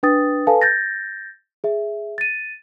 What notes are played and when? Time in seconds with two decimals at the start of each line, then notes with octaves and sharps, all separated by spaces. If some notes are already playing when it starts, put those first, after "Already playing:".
0.03 D4 B4 G5 D#6 A6
0.47 A4 B4 F5 G#5 A5
0.61 G6 A6 A#6
1.64 G#4 E5
2.18 A6 D#7